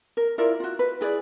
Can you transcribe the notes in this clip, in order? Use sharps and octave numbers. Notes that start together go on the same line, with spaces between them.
A#4
E4 F4 A#4 D5
F4 F#4
B4
E4 G#4 B4 D5